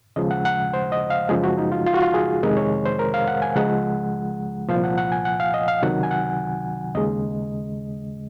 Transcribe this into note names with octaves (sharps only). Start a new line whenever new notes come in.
D#2 C#3 F3 G#3 D#5
F#5
F#5
C5
D#5
F5
F#2 C#3 F3 G#3 G#4
F#4
D#4
F4
F4
F#4
F4
G#4
F2 C3 D#3 G#3 A#4
C#5
C5
A#4
F5
F#5
G#5
C#2 C#3 F3 G#3 F#5
C2 A#2 F3 F5
F#5
F#5
G#5
F#5
F5
D#5
F5
C#2 C3 D#3 F#3 F#5
G#5
F#5
D#2 C#3 G#3 D#5